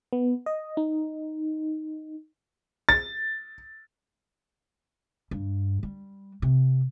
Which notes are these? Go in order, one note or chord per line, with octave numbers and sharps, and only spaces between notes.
B3
D#5
D#4
A6
G2
G3
C3